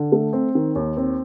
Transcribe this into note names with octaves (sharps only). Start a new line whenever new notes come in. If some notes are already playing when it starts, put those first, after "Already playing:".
Already playing: D3
A3
C4
D#3
D#2
C4